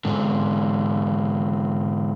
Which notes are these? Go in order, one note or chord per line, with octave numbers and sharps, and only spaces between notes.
G#2 D3